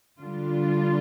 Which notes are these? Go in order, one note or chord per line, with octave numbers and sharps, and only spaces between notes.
D3 G3 D4 F4